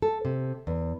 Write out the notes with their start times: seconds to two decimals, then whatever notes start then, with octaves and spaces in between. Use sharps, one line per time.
0.02 A4
0.25 C3
0.67 E2